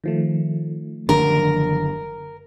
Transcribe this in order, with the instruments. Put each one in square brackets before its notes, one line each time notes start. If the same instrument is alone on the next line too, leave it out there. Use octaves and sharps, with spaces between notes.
[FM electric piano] D#3 F3 A3
[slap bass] F#1 D3 D4 [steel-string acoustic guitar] A#4